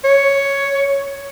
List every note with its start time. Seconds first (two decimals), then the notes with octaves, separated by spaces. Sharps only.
0.04 C#5